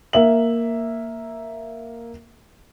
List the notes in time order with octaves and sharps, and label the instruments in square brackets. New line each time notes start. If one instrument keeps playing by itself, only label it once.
[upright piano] A#3 E5 F#7